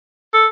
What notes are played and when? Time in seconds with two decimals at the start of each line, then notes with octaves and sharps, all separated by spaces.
0.34 A4